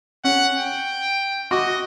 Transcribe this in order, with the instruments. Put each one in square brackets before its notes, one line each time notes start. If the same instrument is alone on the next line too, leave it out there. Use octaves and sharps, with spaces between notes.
[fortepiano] C#4 [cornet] F#5
[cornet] G5
[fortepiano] F#4 C#6 D6 [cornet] D#5